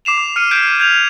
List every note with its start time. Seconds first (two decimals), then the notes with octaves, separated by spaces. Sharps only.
0.05 D6 C7 E7 F7
0.18 D6
0.36 F6 C#7 D#7
0.51 F6 G6 G#6 B6 C7 D7
0.80 G6 G#6 F7